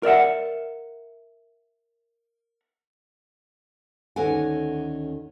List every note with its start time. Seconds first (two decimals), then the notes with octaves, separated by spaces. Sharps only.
0.03 A#4 D5 E5 F#5
4.16 D2 D#3 C#4 A4 F#5 G#5